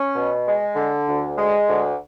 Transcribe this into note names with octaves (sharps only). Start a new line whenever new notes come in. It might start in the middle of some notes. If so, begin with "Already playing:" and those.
Already playing: C#4
B2
G#3
D3
D2
G#3
D2